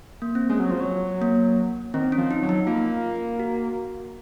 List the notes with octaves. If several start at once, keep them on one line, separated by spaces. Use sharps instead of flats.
A#3
C4
G#3 C#4
F#3
F3
F#3
A#3
D#3 C4
C#4
F3
D#4
F#3
D#4
A#3 F4
F#4